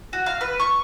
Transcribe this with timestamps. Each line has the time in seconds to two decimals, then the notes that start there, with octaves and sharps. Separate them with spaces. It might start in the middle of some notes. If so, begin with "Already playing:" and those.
0.13 F#4
0.26 F5
0.41 B4
0.60 C#6